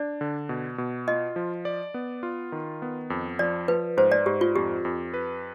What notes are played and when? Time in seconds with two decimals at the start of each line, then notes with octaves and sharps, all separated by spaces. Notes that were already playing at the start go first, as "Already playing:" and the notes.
Already playing: D4 D5
0.21 D3
0.49 B2
0.78 B2
1.07 F4 D#5
1.36 F3
1.65 D5
1.94 B3
2.23 F4
2.52 D#3
2.82 B3
3.10 F2
3.39 F3 D5
3.68 F3 B4
3.97 G#2 C5
4.12 D5
4.26 G#2 G4
4.41 F4
4.56 F2 G4
4.85 F2
5.14 B4